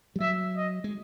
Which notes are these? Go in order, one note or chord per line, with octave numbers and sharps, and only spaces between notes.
G3
F#3 E5
D#5
G#3